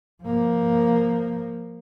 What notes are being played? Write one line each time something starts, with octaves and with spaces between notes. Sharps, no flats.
F3 A#3